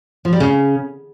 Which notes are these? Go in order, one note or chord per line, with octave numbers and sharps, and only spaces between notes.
F3
G3
C#3